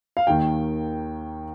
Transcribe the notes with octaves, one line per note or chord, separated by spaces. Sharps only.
F5
D#2 D#3 G5